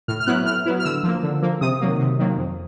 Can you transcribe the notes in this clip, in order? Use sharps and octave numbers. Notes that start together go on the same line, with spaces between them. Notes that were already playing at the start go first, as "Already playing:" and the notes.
A2 F6
F6
F#3 B3 E4 F#6
A2 F6
F#3 B3 E4
F6
D3 E6
F3 A#3
D3
F3 A#3
C3 D#6
D#3 F#3 A#3
C3
D#3 F#3 A#3
F2